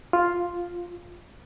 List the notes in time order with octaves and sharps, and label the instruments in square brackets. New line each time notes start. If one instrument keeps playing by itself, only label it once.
[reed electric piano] F4